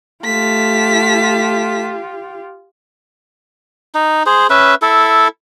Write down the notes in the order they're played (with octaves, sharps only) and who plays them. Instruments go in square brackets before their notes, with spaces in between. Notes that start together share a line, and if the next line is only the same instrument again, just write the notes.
[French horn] A3 [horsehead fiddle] F4 G4 [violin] A5 B6
[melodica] D#4
G#4 C5
C#4 B4 E5
E4 A4